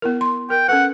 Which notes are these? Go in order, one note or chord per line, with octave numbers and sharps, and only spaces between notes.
B3 E4 A#4
C6
A#4 G5
C#4 A4 B4 F#5